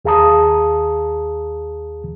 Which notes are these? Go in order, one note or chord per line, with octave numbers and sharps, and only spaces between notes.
D#2 G#4 F5 A5 A#5 D#6